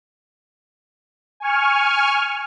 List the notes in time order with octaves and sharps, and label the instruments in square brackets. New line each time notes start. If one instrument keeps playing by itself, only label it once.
[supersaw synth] G#5 C#6 F6